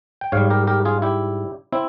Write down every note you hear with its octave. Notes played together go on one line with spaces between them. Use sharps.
G5
G#2 G3 C#5 F5
G4 A#4
G4 A#4
F4 G#4
E4 G4
C4 E4